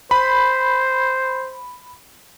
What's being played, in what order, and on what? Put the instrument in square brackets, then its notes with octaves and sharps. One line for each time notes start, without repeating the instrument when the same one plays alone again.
[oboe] C5 [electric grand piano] B5